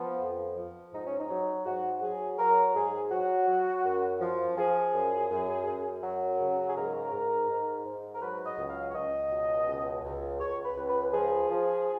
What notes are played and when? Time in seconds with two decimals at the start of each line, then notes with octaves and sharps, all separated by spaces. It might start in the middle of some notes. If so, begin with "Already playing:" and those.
Already playing: F3 B3
0.20 F2
0.57 F3
0.93 G#2 D#4
1.06 C#4
1.20 D#4
1.30 F#3
1.66 G#2 F#4
2.03 F#3 G#4
2.39 F#3 A#4
2.75 G#2 G#4
3.11 F#3 F#4
3.48 F#3
3.85 F#2
4.21 F3
4.57 F3 G#4
4.94 F#2
5.30 F#2
5.67 F#2
6.03 F#3
6.40 C#3
6.68 G#4
6.76 G#2 A#4
7.13 G#2
7.49 G#2
7.85 G#2
8.15 A#4
8.22 F#3 B4
8.46 D#5
8.58 C#2
8.70 F5
8.91 C#5
8.94 C#2 D#5
9.31 B2
9.67 C#2
10.04 C#2
10.40 C#2 C#5
10.65 B4
10.77 C#2
10.89 B4
11.13 F3 G#4
11.50 F3